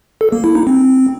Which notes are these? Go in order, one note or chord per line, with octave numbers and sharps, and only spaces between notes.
A4
A#3
E4
D#4
C4